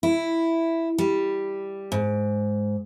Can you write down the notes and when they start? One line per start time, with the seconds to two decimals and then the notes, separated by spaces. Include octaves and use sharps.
0.03 E4
0.98 G3
1.92 G#2